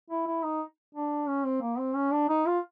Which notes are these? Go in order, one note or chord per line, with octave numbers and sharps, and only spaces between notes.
E4
E4
D#4
D4
C#4
C4
A#3
C4
C#4
D4
D#4
F4